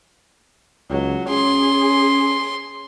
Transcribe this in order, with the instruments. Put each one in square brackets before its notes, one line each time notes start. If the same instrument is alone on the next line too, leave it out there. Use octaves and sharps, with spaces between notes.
[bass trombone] C#2 [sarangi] F#3
[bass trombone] C#4 [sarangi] G#4 [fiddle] C6